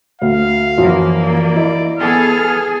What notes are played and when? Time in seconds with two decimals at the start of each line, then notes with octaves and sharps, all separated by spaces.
0.22 D2 F5
0.78 F#2 E3 F3 A#3
1.23 D5
1.56 E4 D#5
1.99 B3 G#4 A4 F6
2.45 G#4